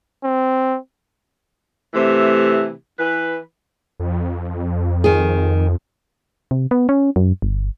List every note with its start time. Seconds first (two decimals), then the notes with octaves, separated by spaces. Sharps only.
0.24 C4
1.94 C3 E3 A3
2.99 E3 B4
4.00 F2
5.04 D#3 G#4
6.51 C3
6.71 B3
6.89 C#4
7.16 F#2
7.42 G1